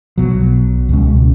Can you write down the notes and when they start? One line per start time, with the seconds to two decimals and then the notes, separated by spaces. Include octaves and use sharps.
0.18 B1 B2 F#3
0.89 C#2 B2 G#3 C#4